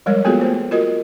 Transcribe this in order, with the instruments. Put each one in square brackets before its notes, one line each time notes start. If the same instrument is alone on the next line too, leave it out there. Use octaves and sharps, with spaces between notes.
[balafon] F3 G3 G#3 A#4 C#5
A#3 B3 F4 F#4 G#4 A4
A3 B3 C5
F4 F#4 A#4 D#5